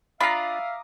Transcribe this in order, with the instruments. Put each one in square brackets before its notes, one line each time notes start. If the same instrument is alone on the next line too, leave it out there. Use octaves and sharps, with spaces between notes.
[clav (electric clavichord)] D4 F4 [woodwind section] E5 F5 [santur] A#5 D6 D#6 [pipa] B5